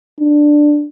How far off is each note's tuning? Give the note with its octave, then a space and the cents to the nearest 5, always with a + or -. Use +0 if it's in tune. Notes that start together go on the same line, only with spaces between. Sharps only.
D4 +5